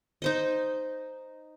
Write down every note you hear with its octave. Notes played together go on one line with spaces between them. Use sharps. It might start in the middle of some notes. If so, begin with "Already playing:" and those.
D#4 C5 D#5